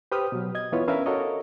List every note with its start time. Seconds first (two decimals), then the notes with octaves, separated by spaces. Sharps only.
0.12 G4 B4 C5 G5 D#6 F6
0.32 B2 F#3
0.55 D#5 G#6
0.72 E3 B3 E4 F4 B4 C#5
0.88 C#4 D4 A#4 B4 E5 F5
1.06 F#4 A4 A#4 C#5 D#5